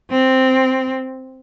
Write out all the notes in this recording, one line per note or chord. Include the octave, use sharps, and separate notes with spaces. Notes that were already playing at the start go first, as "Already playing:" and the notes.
C4